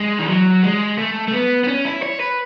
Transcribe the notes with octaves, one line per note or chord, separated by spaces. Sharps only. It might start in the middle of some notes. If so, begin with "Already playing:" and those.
Already playing: G#3
E3
F#3
G#3
A3
A3
B3
B3
C#4
E4
C#5
B4